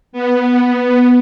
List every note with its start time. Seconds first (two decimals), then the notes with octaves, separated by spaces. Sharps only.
0.13 B3